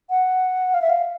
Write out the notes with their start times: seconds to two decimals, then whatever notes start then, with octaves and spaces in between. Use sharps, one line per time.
0.10 F#5
0.74 F5
0.82 E5
0.90 F5